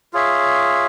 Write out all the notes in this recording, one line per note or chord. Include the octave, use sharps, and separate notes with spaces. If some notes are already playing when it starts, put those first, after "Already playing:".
F4 G#4 C#5 E5